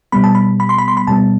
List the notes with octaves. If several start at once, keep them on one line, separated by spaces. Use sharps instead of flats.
B2 G3 B3 B5
A5
B5
B5
C6
B5
C6
B5
B2 G3 B3 A5